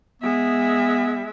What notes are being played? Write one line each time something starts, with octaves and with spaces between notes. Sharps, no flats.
G#3 B3 E5